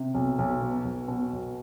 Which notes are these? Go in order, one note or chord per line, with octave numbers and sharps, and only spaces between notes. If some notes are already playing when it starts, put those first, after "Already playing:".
Already playing: C3
B1
B1
B2
B1
B2
B1